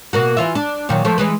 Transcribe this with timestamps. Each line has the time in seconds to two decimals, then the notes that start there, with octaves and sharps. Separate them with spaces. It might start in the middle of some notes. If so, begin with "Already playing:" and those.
0.13 B2 A#3 F#4
0.37 E3 F4 E5
0.55 D4
0.89 A#2 D#3 F#3
1.05 F3 A3
1.18 E3 G#3 B4